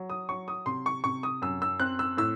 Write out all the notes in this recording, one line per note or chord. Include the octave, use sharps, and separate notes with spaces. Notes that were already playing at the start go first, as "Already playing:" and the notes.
Already playing: F#3
D#6
F#3 C#6
D#6
C3 C6
C#6
C3 C#6
D#6
F#2 E6
E6
C4 F#6
E6
A2 E6